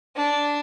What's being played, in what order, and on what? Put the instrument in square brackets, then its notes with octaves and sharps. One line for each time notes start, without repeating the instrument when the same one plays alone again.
[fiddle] D4